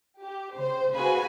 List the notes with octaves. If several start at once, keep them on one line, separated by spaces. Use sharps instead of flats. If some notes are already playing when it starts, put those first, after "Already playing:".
G4
C#3 C5
F#4 G#4 B4 F5 G#5 B5